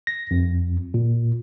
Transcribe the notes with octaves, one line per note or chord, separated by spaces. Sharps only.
A#6
F2
A#2